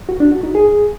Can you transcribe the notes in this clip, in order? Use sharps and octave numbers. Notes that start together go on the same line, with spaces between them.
F#4
D4
F#4
D#4
G#4